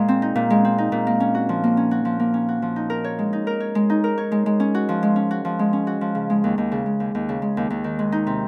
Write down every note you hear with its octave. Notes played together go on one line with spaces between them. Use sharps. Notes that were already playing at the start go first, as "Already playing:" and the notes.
Already playing: A#2 G#3
C4
D#4
A#2
G#3
C4
D#4
A#2
A#3
C#4
F#4
F3
A#3
C#4
F#4
F3
A#3
C#4
F#4
F3
D#4
A#4
C#5
G#3
D#4
A#4
C#5
G#3
D#4
A#4
C#5
G#3
G#3
C#4
F#4
F3
G#3
C#4
F#4
F3
G#3
C#4
F#4
F3
C#3
G#3
D#2
D#2
C#3
G#3
D#2
D#2
C#3
G#3
D#2
D#2
D#3
G#3
D#4
C3